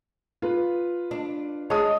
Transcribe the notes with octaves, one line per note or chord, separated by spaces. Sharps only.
F4 B4
D4
G#3 C#5 A5 D#6